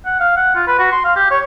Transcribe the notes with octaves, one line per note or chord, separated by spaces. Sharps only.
F#5
F5
F#5
F4
B4
F#4
C6
F5
G4
C#5